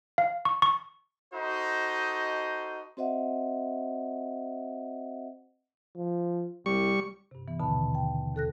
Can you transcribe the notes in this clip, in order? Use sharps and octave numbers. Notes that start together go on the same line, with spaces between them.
F5
C#6
C#6
D#4 F#4 A4 C5 D#5
C4 F#4 C5 D#5 E5 F#5
F3
C2 G3 C#6
G2 C3
E3 B3
D#2 B2 D3 D#3 A5 B5
G5
D#2 A4 F#6 A#6